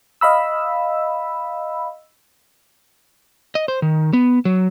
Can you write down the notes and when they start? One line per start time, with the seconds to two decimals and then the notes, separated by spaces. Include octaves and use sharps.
0.21 D#5 F5 B5 E6
3.55 D#5
3.68 C5
3.82 D#3
4.13 B3
4.45 F#3